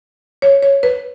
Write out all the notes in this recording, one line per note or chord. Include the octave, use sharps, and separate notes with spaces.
C#5
C#5
B4